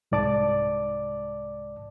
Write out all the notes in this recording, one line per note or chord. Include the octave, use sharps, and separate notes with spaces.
C2 G#2 D5 A5 D6